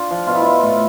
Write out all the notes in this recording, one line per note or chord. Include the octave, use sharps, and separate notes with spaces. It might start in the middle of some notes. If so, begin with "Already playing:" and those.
Already playing: D4 F4
F3
B2 F4
E4
F4
A2